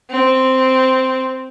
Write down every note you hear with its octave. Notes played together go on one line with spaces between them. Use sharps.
C4